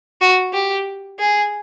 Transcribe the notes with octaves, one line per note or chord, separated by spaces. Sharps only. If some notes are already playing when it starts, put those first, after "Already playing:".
F#4
G4
G#4